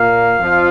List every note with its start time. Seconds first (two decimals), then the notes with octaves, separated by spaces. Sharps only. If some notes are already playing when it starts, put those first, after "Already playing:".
Already playing: A#2 A#3 F5
0.39 F2 F3